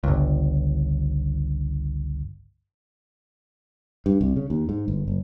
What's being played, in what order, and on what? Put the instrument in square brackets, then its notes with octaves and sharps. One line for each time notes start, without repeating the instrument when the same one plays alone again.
[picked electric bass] G1 C#2
[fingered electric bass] G2
C2
C#3
D#2
G#2
G1
F#1